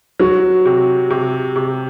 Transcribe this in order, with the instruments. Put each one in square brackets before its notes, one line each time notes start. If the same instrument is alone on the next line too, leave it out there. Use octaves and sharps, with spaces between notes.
[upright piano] F#3 [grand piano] F#4
[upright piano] C3
C3
C3